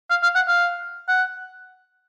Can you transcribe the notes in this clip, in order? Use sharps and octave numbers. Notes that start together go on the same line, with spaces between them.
F5
F5
F#5
F5
F#5